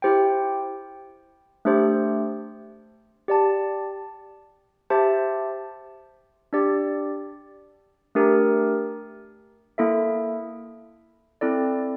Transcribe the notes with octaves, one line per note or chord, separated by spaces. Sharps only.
E4 G4 C5 G5
A3 D4 G4 C5
G4 D5 A5
G4 C5 E5 A5
D4 G4 D5
A3 D4 G4 A#4
A#3 E4 A4 E5
C4 E4 A4 D5